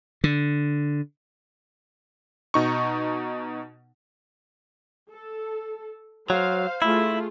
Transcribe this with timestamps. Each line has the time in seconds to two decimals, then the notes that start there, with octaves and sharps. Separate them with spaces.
0.24 D3
2.54 B2 D#4 C#6
5.12 A4
6.30 F#3 C5 F5
6.82 A3 E4 F4 G#4